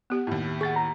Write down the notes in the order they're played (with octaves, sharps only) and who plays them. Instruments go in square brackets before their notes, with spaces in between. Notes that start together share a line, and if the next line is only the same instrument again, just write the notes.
[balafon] B3 G4 F#5
[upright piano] D#2 A2
[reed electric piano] G#4 A6 [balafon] F#5 C#6
[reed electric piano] A#5